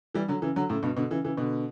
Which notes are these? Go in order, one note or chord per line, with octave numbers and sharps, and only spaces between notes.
E3 G3
D3 F#3
C#3 E3
D3 F#3
A2 C#3
G2 B2
B2 D3
C#3 E3
C#3 E3
B2 D3